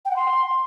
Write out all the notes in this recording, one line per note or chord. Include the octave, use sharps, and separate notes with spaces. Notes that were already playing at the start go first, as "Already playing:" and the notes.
G5
F#5
C6